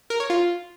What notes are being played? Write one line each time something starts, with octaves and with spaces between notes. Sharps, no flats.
A#4
C#5
F4